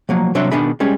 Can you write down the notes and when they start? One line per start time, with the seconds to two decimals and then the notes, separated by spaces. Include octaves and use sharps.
0.09 F3 F#3 A#3
0.35 C2 F#3 D4 C#5 E5 C6
0.51 B2 D#3 B3 D4 G#4 B5
0.80 G3 G#3 C#4 G#4